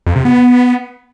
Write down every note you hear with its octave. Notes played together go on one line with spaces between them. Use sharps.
F2
C3
B3